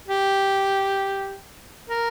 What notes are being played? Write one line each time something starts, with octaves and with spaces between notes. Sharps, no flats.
G4
A#4